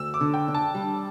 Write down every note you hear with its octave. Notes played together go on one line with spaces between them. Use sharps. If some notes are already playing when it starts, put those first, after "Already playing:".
Already playing: D2 E6
D6
D3
G5
D4
A5
G3